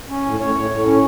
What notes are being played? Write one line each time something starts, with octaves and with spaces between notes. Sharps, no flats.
C#4
A2
A2 C#5
A2
A2
C#4